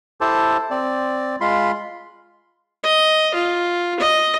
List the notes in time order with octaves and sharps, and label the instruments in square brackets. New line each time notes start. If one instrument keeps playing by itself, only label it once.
[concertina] E4 G4 A4 C5 A5
C4 D5
G#3 F4 B5 C6
[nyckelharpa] D#5
F4
D#5